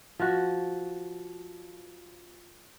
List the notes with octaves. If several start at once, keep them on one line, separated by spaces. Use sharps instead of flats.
F3 F#4